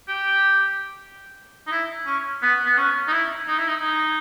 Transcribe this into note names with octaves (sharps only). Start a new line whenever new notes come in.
G4
D#4
E4
C#4
B3
B3
C#4
D#4
E4
D#4
E4
D#4
D#4